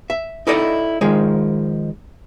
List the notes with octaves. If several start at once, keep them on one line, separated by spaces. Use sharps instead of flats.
E5
D#4 E4 A4 D5 D#5
D#3 F3 G#3